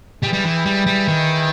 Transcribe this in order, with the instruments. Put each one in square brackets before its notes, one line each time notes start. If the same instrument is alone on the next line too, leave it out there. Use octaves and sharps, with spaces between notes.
[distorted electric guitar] G3 [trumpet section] E4 G#4 B4 G5
[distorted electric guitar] G3
E3
G3
G3
D#3